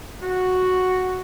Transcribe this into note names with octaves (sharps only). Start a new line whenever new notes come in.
F#4